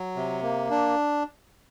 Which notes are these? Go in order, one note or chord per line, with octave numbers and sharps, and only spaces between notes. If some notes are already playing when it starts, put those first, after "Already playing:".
Already playing: F#3
C3
A#3
D4